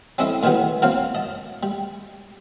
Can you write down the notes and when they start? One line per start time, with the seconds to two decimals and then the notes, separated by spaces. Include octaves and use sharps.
0.18 C4 C#4 E4 A4 D#5 E5
0.43 A2 D#3 E3 F#3 G3 B3
0.82 F3 A#3 C4 F#4 C#5 F5
1.15 D#5 A5
1.63 G3